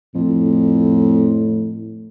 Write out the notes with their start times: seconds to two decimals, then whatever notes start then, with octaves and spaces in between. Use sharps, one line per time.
0.15 F2 A2